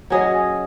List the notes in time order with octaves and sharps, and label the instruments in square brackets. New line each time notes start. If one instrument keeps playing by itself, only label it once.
[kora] F#3 C#4 G#4 D#5